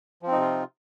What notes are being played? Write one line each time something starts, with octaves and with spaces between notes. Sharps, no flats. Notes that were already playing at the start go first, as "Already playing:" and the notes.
C3 F3 C4 D#4 F4